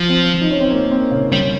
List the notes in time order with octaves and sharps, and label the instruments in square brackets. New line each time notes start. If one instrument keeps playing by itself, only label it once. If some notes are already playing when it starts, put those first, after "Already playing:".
Already playing: [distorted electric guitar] F3
[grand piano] C4
D#4
C#4
C4
A#3
C4
C#3 C#4
[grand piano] C#3 C#4 [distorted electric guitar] G3